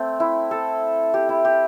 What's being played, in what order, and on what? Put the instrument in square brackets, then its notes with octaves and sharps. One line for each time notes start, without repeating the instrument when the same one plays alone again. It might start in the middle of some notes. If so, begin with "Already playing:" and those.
Already playing: [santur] A3 C4
E4
A4
G4
E4
G4